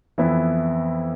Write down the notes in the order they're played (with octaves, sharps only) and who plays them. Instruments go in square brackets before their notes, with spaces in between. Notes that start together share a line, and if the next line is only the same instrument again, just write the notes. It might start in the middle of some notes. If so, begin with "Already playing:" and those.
[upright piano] F2 E3 B3 E4